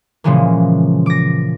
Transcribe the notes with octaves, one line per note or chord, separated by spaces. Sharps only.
A#2 C#3 E3 F3 G#3 A#3
D6 A#6